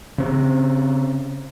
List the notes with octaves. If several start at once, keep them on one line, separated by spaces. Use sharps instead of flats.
C#3 C4